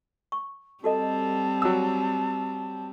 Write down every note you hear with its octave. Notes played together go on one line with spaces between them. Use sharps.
C#6
G3 C4 F#4 A4 D#5 A5
F#3 E6